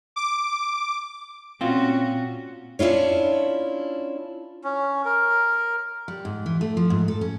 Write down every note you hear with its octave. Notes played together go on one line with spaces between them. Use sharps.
D6
A#2 C4 C#4 F4 F#4
C#4 D4 E4 F4 C#5
C#4
A#4
G3
G#2
E3
A3
F3
G#2
A4
C#4